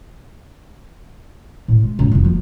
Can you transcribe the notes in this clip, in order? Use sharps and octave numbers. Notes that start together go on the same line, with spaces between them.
A2
G#3
C#2 G#2
F1 C2
F3 A#3